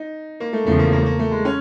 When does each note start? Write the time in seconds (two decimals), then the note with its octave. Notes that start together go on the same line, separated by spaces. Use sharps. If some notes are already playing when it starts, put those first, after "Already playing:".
Already playing: D#4
0.40 A#3
0.53 A3
0.66 E2 C#3 F3 A3
0.79 A#3
0.93 A#3
1.00 A3
1.06 A#3
1.19 A3
1.31 G#3
1.45 C#4